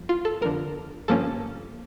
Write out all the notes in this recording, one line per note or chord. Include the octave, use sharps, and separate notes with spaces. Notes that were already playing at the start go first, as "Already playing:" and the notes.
Already playing: G1 F2
F4
A4
G1 F2 D3 A#4
G1 G2 F3 A#3 C#4 A4